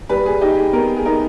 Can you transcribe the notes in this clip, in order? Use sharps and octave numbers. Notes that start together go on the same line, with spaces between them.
G3 B4
G#4
D#4 G4
G#4
B3 A#4
G#4
D#4 A#4